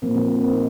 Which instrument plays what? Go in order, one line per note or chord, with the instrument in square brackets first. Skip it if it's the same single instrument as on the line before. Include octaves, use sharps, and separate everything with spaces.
[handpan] A#2 F3 A#3 C4
C4
A#3
C4
D#4